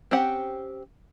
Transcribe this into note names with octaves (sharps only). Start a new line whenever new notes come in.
C4 C#4 G4 F#5